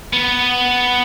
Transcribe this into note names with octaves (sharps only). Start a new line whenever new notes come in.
B3